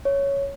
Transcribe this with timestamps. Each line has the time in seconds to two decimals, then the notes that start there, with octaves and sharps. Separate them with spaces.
0.05 C#5